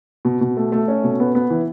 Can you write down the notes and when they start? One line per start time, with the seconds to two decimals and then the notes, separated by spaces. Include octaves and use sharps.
0.25 B2
0.41 B2
0.57 A3
0.72 A3
0.88 C#4
1.04 B2
1.20 B3
1.35 B3
1.50 E3